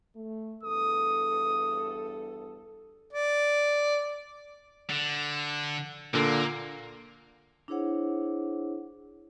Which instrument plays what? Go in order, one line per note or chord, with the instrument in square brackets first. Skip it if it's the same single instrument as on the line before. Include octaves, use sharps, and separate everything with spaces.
[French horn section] A3
[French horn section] E2 G2 A4 [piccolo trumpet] D#6
[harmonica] D5
[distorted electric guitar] D3
[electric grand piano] A#2 D3 [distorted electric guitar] A#3
[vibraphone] D4 E4 G#4 C5 C#5 F#5